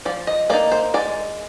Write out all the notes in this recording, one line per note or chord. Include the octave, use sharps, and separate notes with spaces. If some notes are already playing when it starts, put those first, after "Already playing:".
F3 D5
D#5
A#3 D#4 D5
C5
G#3 D5